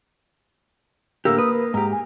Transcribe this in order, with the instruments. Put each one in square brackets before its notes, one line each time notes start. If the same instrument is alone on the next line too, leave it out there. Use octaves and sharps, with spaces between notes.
[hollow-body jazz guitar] A2 D3 G4 [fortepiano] A#3 [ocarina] E6
[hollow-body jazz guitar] B4 [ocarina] D#6
[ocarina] A#4
[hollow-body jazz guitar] G#2 G4 [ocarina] A#5
[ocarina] G#5